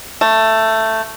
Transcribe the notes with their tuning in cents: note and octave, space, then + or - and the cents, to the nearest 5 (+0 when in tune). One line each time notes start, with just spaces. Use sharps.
A3 +10